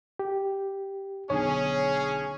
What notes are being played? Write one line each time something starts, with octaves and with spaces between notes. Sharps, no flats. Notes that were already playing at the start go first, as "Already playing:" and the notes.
G4
B1 D3 C#4 G#4 C#5